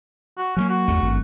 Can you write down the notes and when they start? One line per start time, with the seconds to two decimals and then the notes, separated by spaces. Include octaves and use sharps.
0.37 F#4
0.57 F#3 G#3 A#3 C#4
0.69 F#4
0.88 G1 E2 A3
1.02 G#1